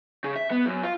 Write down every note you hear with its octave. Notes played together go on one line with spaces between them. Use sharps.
C#3
E5
B3
F#2
F4